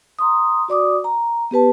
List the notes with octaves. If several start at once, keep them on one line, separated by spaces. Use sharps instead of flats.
A#5 C6 D#6
F#4 D5 D6 D#6
A#5
B3 G4 B4 A5